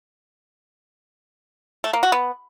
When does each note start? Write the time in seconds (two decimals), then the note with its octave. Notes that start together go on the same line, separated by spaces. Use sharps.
1.84 A3
1.93 A#3
2.03 F#4
2.12 B3